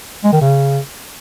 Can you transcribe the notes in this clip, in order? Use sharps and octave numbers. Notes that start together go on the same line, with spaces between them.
G#3
D#3
C#3